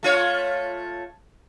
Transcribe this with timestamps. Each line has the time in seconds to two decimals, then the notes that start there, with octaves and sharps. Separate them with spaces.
0.03 A3 F4 C#5